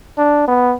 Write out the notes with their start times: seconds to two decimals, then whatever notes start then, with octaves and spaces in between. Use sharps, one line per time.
0.18 D4
0.48 B3